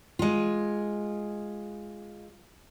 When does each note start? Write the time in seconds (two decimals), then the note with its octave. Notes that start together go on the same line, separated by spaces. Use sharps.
0.19 G#3 F4